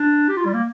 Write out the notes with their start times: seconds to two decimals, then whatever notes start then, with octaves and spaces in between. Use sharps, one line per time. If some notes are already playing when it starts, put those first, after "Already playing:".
Already playing: D4
0.28 G4
0.37 F4
0.45 G3
0.54 A#3